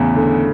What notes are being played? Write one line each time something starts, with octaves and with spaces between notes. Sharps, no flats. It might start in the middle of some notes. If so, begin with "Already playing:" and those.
Already playing: E2 A2 C#3
D3